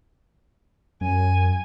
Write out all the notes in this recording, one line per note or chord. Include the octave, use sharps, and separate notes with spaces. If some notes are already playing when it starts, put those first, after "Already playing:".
F#2 G#5